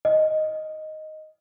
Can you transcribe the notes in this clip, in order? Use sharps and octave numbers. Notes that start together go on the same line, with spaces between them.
D#5